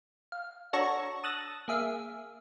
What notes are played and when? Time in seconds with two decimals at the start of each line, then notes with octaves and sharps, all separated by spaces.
0.32 F5
0.73 D4 F#4 A4 C#5 A#5 C#6
1.23 A5 D#6 E6 F#6 A6 A#6
1.68 A#3 G#4 E5 F5